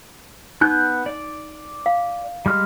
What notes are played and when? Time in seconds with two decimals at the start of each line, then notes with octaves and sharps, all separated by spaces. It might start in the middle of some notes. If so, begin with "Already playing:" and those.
0.61 B3 D#4 F#6 G6
1.06 D5
1.86 F5
2.46 G3 G#3 F6